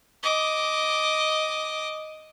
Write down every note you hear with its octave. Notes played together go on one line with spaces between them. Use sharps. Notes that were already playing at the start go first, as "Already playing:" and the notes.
D#5 D6